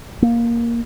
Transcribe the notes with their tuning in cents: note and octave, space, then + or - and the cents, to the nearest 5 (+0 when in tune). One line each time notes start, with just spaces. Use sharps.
A#3 +5